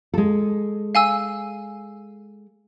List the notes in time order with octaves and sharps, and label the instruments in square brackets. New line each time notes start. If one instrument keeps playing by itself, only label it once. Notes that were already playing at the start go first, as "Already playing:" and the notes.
[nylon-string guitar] G#3 A4
[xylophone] F5 G#5 E6